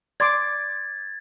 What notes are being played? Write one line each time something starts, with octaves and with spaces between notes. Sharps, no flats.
D5 C6 D6 G#6 A6